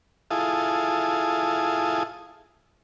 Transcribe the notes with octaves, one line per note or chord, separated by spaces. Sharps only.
E4 F4 G#4 A4 D#6